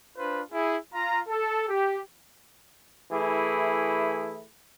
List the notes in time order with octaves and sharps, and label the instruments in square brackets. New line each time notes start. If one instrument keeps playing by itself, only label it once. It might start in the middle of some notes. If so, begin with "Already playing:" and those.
[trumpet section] D4 F4 B4 C5
E4 G#4
F4 A#5
A4
G4
[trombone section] E3 A3 E4 G#4